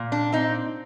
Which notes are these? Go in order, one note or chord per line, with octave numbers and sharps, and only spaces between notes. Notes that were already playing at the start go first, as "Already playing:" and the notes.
Already playing: A#2
D4
C4 D#4